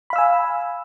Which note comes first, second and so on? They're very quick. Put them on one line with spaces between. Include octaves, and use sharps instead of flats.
B5 F5 E6 G#5